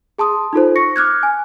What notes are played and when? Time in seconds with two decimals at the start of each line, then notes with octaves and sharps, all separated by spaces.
0.18 G#4 A5 C6 D#6
0.53 D#4 F4 A4 C5
0.76 C#6 A#6 C#7
0.96 D6 F6 F#6 G#6
1.23 G#5